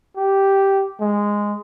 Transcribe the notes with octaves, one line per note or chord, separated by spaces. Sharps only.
G4
G#3